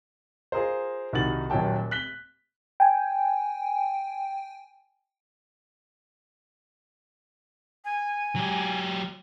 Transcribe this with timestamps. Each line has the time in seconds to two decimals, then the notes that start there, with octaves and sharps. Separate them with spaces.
0.52 F4 G#4 A#4 C5
1.13 C2 D#3 D#4 F#4 A6 F#7
1.50 D#1 A#2 F#3 G5 A5
1.91 F#6 B6 G7
2.80 G5 G#5
7.85 G#5
8.36 F#3 G4